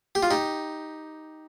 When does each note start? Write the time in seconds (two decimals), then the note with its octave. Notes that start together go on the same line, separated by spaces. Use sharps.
0.15 G4
0.23 F4
0.31 D#4 G4